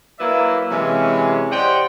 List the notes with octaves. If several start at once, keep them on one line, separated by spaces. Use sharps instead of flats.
F#3 A#3 E4 B4 D5 E5
C3 E3 F#3 G#3 C#4
G4 C5 D5 D#5 F#5 G5